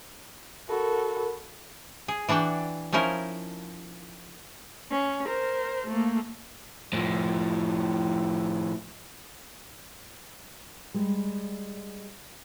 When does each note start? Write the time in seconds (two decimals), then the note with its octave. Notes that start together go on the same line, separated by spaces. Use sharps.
0.69 F#4 A4 A#4 B5
2.08 G#4
2.29 E3 D4 F#4 D5 G5
2.93 F3 C#4 D#4 E4 A#4
4.91 C#4
5.27 A#4 C5
5.87 A3 A#3
6.93 A2 F3
10.94 G3 G#3